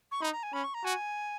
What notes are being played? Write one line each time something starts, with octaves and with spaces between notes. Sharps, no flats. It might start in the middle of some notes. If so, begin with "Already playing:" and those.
C#6
D#4 B5
A#5
G#5
C#4 B5
C#6
A#5
F#4 G#5